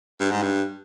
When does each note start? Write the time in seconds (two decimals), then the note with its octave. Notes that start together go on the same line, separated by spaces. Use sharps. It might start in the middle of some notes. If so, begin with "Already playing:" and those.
0.20 G2
0.31 G#2
0.43 G2